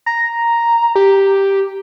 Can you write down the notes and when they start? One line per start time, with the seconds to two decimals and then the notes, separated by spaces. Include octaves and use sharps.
0.06 A#5
0.96 G4